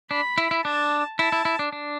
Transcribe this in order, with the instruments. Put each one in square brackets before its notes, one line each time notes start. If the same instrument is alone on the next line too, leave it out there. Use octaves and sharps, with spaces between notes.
[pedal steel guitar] D4 [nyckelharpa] B5
[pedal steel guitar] E4
E4
[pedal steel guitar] D4 [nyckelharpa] A5
[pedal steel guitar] E4 [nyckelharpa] A5
[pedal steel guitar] E4
E4
D4
D4